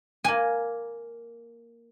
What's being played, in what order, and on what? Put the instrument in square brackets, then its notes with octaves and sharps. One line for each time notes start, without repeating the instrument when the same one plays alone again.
[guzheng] A#3 G#5